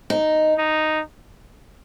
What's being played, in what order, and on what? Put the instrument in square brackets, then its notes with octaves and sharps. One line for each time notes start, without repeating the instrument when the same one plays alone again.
[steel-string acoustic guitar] D#4
[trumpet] D#4